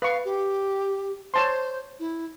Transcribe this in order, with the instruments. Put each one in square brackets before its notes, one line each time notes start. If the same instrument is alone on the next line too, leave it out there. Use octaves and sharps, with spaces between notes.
[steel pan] B4 C#6 [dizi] F5
[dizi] G4
[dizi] C5 [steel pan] C#5 A5 C6
[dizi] E4